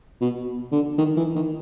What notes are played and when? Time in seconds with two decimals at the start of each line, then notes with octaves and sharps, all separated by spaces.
0.21 B2
0.72 D3
0.98 D#3
1.17 E3
1.36 D#3